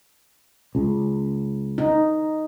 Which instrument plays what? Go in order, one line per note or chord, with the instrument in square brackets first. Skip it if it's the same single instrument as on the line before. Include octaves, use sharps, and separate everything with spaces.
[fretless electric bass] C#2
[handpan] D#4